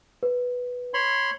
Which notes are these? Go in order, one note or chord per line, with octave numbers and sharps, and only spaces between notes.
B4
C#5 B5 C6